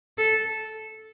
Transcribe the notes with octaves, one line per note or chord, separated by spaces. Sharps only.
A4